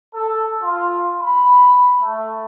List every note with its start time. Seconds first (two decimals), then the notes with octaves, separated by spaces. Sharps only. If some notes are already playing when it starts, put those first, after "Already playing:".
0.13 A4
0.62 F4
1.21 B5
2.02 A3